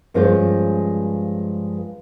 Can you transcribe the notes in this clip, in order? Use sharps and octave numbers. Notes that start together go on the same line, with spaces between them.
G2 F3 G#3 C#4 F4 C5